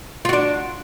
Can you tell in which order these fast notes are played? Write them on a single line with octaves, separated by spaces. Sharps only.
F4 F#4 D4